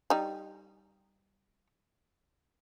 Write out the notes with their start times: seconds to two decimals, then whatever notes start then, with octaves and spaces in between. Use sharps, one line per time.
0.10 G3 D#4